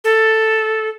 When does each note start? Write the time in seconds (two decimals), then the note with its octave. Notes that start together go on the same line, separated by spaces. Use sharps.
0.04 A4